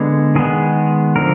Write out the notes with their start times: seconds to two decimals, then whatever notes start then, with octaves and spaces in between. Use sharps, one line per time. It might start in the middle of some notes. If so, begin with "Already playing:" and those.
Already playing: D3 G#3 B3
0.35 D#3 G#3 B3 G#4
1.16 D3 F3 A#4